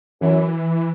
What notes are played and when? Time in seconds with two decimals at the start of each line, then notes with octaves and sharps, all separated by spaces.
0.21 F#2 E3